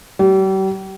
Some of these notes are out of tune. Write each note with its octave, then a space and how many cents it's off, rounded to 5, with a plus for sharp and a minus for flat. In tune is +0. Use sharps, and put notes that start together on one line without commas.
G3 -40